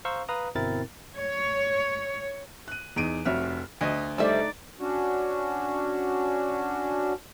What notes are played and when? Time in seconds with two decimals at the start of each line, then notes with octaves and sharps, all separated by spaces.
0.05 C5 F5 A#5 C#6 E6
0.29 B4 F5 A#5 D#6
0.55 G1 B2 C4 E4 A#4 A6
1.16 C#5
2.68 F#6 D#7
2.96 E2 D#4 D7 D#7
3.25 F1 F2 F#4 C#5 E5 F6
3.81 D2 D#5
4.18 G3 A3 D#4 C5 D5 E5
4.80 C#4 D4 F#4